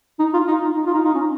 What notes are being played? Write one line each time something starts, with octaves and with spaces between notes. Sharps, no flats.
D#4
F4
D#4
D#4
F4
D#4
D#4
C#4